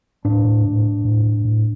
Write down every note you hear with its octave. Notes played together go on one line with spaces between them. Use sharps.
A2 D4
A2
A2
A2
A2
A2
A2